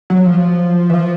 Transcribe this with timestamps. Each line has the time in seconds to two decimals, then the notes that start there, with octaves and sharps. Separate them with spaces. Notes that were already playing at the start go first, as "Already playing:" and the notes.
0.10 F#3
0.26 F3
0.90 E3
0.94 F3